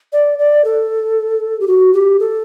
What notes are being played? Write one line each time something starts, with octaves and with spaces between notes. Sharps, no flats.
D5
D5
A4
G4
F#4
G4
A4